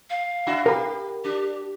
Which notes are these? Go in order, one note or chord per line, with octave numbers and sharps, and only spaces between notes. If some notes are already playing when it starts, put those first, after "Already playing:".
F5
D4 E4 F#4
G4 A#4 B5
D4 G4